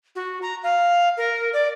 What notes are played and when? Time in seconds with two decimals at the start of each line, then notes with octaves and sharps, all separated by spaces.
0.15 F#4
0.42 A#5
0.63 F5
1.17 A#4
1.53 D5